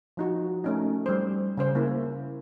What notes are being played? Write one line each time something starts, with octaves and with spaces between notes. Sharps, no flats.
F3 D#4 F#4
A3 C#4 D#4
G3 C5
C#3 C#4 C5
A#3 E4